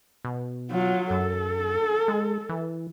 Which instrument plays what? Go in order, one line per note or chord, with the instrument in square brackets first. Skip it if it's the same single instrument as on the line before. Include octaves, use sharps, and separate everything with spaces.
[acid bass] B2
[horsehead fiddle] F#3 F4
[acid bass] F#2 [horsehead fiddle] A4
[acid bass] G#3
E3